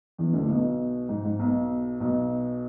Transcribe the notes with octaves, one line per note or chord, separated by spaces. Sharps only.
E2 E3
D2 D3
A2
B1 B2
G#2
G#2
B1 B2
B1 B2